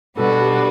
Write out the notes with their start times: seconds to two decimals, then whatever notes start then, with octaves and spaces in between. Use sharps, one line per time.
0.17 B2 G3 D4 F#4 A4 B4
0.39 G4